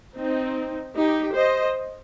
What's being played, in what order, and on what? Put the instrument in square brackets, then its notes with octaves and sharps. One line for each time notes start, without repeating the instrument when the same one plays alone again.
[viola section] C4 D#4
D#4 G4
C5 D#5